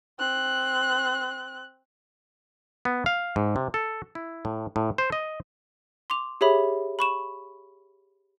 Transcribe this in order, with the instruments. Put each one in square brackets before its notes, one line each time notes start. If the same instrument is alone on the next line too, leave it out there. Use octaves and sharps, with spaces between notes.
[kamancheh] C4 F#6
[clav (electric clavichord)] B3
F5
G#2
C3
A4
E4
A2
A2
C5
D#5
[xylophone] C6 D6 F7
G4 G#4 C#5 E5 B5
B5 C#6 E7